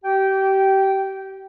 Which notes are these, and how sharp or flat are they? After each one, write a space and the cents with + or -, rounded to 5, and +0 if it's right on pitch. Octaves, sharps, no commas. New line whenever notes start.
G4 -30 G5 -15